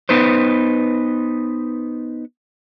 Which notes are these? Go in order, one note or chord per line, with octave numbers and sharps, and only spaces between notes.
B3 D#4 B4 C5